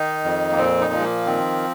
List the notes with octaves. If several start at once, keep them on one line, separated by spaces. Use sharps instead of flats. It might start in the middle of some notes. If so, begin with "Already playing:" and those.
Already playing: D#3 D#4
F2
A#3
A#2 C4
D#4
F3
G#3
A#3
D#3 C4